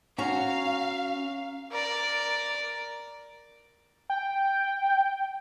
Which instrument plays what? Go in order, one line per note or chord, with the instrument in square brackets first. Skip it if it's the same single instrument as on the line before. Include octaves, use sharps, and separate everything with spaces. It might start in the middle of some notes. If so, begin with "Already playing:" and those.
[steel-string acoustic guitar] C#4 F#4 A#5 [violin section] F5
[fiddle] A#4 D5
[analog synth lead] G5